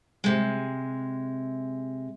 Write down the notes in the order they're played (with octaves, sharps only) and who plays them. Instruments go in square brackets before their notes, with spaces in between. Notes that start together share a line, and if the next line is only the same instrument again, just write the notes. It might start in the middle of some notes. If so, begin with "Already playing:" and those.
[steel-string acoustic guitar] C3 G#3